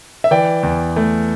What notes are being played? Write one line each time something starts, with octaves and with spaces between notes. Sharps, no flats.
E5
E3 D5 G5
E2
A3